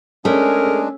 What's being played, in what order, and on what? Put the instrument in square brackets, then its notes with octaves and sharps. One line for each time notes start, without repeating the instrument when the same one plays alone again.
[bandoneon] G#3 D4 [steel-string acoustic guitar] A3 [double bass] C#4 [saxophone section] G#4 A#4